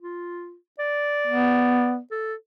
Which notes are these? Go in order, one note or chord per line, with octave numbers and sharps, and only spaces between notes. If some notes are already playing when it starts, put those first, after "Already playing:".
F4
D5
B3
A4